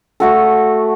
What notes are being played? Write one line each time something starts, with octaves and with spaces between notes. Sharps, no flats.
A3 F#4 A4